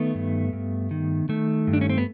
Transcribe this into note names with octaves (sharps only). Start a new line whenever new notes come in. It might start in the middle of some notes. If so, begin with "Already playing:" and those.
Already playing: D#3 A3 B3
G2
G2
D#3
D#3 A3
G2
D4
C#4
C4
B3